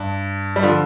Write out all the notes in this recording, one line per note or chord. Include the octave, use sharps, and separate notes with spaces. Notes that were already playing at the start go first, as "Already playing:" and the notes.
Already playing: G2
G3
D3 F3